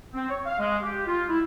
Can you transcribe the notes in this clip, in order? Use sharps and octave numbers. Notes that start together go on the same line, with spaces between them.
C4
C#5
F5
G#3
G4
F4
E4